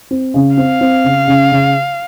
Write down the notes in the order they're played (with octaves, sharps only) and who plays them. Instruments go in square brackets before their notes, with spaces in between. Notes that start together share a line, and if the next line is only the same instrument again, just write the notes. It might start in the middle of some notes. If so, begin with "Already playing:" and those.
[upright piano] C4
C#3
[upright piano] C4 [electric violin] F5
[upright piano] C4
C#3
C#3
C#3